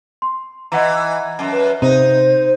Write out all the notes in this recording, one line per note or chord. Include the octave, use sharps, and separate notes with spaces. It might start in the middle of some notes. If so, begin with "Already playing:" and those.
C6
E3 D#5 F#5 A#5
F#2
B4
C3 D#4 C5